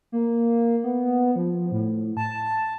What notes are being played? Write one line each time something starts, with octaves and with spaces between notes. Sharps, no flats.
A#3
B3
F3
A2
A5